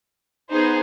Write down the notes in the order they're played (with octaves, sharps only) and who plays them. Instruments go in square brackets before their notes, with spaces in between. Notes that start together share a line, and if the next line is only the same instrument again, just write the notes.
[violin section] B3 D#4 G#4 C5